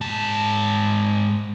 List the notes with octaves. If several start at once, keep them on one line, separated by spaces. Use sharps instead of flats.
G#2 A5